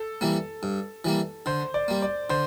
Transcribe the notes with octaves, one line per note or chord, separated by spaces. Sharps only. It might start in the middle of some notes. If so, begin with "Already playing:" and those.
Already playing: A4
E3 G3 A#3
G2
E3 G3 A#3
D3 C5
D5
G3 A#3
D5
D3 C5